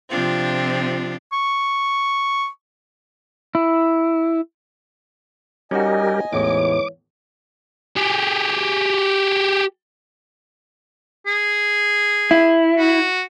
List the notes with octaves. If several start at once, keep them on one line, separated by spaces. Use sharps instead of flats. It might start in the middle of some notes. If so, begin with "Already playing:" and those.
C3 F3 C4 D4 F4
C#6
E4
G3 C#4 D#4 F#4 G4 A#4 D#5 G#5
A1 E2 G#2 E3 C#5 D6
G4 G#4
G#4
E4
F#4